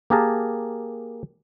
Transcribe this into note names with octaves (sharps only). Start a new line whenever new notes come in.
A#3 G4 G#4 A#4 A5